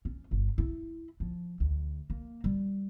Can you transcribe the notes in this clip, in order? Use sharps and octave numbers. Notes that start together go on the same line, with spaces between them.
C#4
G1
E4
F3
D2
A#3
G3